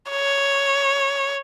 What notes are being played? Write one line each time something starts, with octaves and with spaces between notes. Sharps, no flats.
C#5